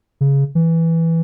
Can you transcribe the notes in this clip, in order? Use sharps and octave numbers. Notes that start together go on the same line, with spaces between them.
C#3
E3